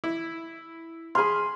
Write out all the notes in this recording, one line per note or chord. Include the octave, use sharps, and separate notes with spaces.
E4
G#4 B5 C6 F6